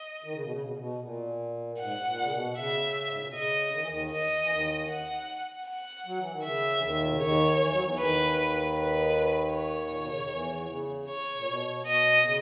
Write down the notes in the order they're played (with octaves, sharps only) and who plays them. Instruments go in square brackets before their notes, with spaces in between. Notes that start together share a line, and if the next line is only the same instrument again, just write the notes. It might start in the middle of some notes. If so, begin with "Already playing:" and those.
Already playing: [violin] D#5
[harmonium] D#3
C#3
B2
C#3
B2
C#3
B2
A#2
[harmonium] G#2 [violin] F#5
[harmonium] G#2
A#2
C#3
B2
[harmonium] C#3 [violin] E5
[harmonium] G#2
A#2
B2
[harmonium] C#3 [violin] D#5
[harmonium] D#3
E3
D#2 D#3
[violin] D#5
[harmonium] E3
D#2 D#3
[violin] F#5
F#5
[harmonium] F#3
E3
D#3
[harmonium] C#3 [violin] E5
[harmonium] E3
D#2 D#3
A#2
B2
C#3
[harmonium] D#2 D#3 [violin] C#5
[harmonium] E3
F#3
E2 E3
[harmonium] D#2 D#3 [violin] B4
[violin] B4
C#5
[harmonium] A#2
B2
C#3
D#3
E2 E3
C#3
[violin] C#5
[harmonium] A#2
B2
[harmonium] B2 [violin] D#5
[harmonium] C#3